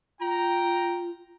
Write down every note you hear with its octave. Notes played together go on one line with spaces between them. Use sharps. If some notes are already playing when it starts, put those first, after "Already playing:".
F4 G5 A#5